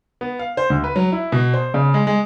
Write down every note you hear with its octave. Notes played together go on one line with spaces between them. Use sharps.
B3
F5
C5
D2
B4
F#3
E4
B2
C5
C#3
G#3
G#3